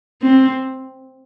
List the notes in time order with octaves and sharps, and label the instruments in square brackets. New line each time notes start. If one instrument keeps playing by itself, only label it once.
[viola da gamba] C4